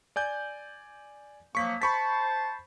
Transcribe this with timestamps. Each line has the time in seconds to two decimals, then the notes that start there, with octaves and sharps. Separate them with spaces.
0.16 D5 G#5 G6
1.55 F3 F#3 A#3 C#6 B6
1.82 C5 A5 B5 C#6 B6